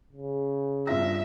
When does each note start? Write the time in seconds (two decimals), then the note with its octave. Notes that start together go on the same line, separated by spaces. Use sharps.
0.12 C#3
0.87 G2 F4 E5 A#6